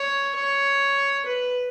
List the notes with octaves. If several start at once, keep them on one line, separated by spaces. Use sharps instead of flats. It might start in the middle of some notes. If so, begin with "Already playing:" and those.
Already playing: C#5
C#5
B4